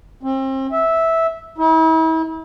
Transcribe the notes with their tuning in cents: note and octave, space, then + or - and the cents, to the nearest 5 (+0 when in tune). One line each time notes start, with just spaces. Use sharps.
C4 +35
E5 -10
E4 -40